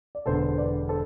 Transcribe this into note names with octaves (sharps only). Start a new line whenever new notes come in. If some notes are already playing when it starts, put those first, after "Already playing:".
D5
E1 E2 D3 A4 C5
B4 D5
A4 C5